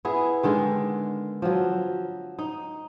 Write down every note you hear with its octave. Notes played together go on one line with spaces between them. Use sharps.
B3 E4 G#4
D3 D#3 G#3
F3 F#3
D#4